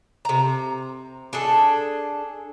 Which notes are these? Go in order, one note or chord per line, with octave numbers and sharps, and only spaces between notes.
C3 A#5
D4 G#4 A4